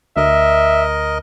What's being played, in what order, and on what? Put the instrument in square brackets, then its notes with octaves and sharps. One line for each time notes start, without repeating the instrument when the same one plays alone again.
[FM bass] D2 [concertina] A#4 D#5 [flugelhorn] E5